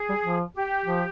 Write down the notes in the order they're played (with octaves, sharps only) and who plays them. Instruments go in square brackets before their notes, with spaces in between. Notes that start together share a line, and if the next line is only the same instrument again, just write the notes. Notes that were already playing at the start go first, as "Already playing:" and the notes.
Already playing: [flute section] G#4
[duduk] G3
F3
[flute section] G4
[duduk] F3